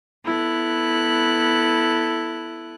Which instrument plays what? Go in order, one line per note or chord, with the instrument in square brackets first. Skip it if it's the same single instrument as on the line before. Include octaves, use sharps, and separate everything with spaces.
[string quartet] B3 E4 A4 F#6